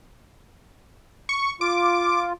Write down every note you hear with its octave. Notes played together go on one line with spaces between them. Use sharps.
C#6
F4 D6